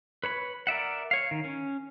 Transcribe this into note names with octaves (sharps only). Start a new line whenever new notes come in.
B4 C#5 B5
A#4 D5 E5 F#5
C#5 F5
D#3
C#4